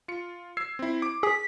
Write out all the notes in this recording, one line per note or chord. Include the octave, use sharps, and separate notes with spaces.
F4 C#7
E6 G#6 C7
C4 E4
D6 D7
G#4 B6